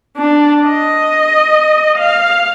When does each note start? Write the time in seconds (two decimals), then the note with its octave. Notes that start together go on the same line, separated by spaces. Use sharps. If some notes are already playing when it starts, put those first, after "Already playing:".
0.17 D4
0.67 D#5
1.98 F5